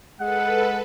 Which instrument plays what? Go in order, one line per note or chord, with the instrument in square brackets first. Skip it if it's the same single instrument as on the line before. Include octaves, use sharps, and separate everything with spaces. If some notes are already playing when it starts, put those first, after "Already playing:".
[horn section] G#3 F#5 [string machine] A4 B4